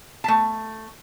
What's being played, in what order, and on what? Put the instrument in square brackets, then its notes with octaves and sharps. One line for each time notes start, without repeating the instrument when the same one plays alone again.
[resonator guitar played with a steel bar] A3 A5